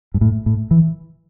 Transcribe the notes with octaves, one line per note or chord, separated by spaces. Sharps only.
G2
A2
A2
E3